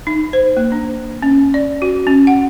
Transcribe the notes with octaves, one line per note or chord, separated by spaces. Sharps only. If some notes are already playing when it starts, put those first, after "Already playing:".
D#4
C5
A#3
D4
C#4
D5
F#4
C#4
F#5